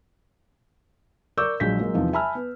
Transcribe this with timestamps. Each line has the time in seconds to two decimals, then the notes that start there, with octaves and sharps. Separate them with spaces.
1.38 A#4 D5 C#6 D6 E6 G6
1.60 A#1 F#3 G#3 G6 B6
1.79 F#3 G#3 A#3
1.94 E2 C3 F3 D#4
2.13 E5 G#5 A5 B5 E6 F6
2.35 B3